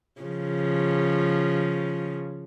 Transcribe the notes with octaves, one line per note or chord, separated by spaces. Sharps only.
C#3 F3